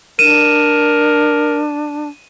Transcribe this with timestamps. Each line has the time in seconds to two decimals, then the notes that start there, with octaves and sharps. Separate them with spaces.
0.19 D4 A#4 D#7 E7